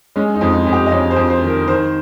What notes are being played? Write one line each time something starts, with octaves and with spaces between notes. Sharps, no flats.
G#3 C#4
D#4
F2
D#4
F2
G4
D#5
F2 C#5
C5
F2
C5
D#3
A#4
D#3 C5